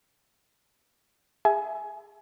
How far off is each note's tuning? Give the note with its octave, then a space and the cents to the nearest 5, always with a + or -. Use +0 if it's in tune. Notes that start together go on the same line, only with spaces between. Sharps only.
G#4 -25 E5 +0 G#5 +20